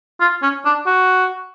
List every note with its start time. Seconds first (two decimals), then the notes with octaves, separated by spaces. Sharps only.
0.20 F4
0.42 C#4
0.65 D4
0.86 F#4